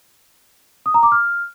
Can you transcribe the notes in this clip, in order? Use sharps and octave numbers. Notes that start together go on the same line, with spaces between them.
D#6
A#5
D6
F6